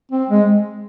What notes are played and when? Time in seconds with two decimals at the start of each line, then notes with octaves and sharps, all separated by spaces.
0.12 C4
0.30 G#3